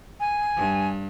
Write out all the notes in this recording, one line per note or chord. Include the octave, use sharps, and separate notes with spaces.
G#5
G2